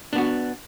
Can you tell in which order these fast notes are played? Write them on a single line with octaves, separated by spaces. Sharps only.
D4 B3 F#4